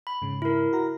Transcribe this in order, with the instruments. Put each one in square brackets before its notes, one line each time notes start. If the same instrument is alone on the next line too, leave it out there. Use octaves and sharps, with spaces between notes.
[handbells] B5
[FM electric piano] G#2 C#3
[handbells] E4 A#4
[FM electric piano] F#4 A#5